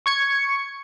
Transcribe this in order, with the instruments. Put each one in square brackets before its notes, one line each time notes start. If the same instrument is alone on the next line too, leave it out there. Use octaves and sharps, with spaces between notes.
[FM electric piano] C#6 G#6 C#7